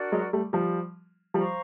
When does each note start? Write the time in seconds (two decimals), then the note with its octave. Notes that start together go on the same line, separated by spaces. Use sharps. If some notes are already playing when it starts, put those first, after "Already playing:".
Already playing: D4 F#4 A#4 D5
0.12 F#3 G#3
0.33 G3 A3
0.53 F3 G3
1.34 F3 G3 C5 F5 A#5 C#6